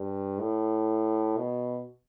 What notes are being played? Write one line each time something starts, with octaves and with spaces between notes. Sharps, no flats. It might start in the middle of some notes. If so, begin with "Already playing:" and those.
Already playing: G2
A2
B2